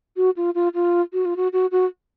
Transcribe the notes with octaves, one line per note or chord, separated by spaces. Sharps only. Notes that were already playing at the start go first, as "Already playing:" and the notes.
F#4
F4
F4
F4
F#4
F4
F#4
F#4
F#4